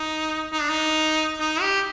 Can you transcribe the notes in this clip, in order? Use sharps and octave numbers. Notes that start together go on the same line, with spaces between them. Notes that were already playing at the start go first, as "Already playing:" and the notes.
Already playing: D#4
D#4
D4
D#4
D#4
G4